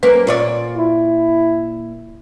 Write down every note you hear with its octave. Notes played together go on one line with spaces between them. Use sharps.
A#3 C#4 B4
A#2 F4 C#5 D5
E4